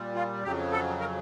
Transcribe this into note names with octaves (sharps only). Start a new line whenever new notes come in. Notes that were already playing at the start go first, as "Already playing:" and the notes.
Already playing: A#2 G3
F4
F2 C#3 F#3 G4
A4
A#4